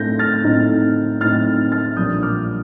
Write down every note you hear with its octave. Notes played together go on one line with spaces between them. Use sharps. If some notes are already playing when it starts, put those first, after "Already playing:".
Already playing: A2 A3 C4 D#4 G6 A#6
F6 A6
A2 A3 C4 D#4
A2 A3 C4 D#4 F6 A6
F6 A6
A#1 A#2 G3 D4 D#6 G6
D6 F6